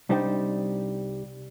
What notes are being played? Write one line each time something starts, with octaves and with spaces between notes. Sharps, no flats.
C2 G3 D4 D#4 C5 G5